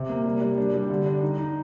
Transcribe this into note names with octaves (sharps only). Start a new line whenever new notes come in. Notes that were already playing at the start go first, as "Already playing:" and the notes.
Already playing: C3
A#3
G3
G3
D4
G3
D3
D4
D#4
D#4